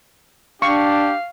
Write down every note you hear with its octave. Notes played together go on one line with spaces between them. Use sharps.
D4 G4 F5 C#6